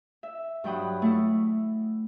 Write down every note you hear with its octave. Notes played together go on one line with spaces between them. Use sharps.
E5
G2 F#3 G5 B5 D#6
A3 E4